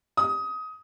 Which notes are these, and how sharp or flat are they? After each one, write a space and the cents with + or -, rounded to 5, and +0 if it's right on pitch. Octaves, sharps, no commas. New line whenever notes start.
D#6 +20